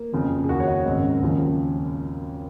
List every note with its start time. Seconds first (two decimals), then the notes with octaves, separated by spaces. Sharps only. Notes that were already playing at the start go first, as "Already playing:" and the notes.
Already playing: A#3
0.12 F#1 F2 C#3 F3
0.44 G#4
0.49 D#2 D#3 F#4
0.60 C#5
0.67 D#5
0.86 G#1 F#2 C#3
1.22 D#2 C#3 F3